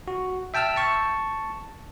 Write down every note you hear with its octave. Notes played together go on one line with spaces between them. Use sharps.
F#4
E5 G5 A5 E6 F6
A5 C#6